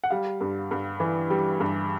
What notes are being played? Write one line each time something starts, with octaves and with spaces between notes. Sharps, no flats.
F#5
G3 F5
G2
G2
E3
G3
G2